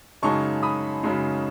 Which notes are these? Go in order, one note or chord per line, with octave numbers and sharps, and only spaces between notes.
F#2 C#3 G#3 D#4 A5 C#6
B5 D#6
F#2 C#3 G#3 D#4